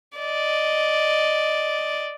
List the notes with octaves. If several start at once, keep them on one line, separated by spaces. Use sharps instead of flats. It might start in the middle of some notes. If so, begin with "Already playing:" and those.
D5 D#5